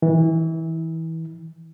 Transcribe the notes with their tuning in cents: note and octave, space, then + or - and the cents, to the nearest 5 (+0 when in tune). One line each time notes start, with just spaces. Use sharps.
E3 -25